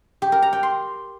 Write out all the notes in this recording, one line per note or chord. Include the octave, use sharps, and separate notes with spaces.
G4
A#4
A#5
G5
C6